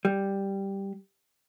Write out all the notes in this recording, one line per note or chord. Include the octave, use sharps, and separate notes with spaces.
G3